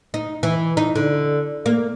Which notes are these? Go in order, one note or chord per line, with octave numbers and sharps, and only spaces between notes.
D#4
E3
D#4
D3
A#3